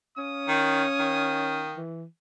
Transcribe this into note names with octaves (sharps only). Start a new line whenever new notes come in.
C#4 F5 D#6
D#3
D#3
E3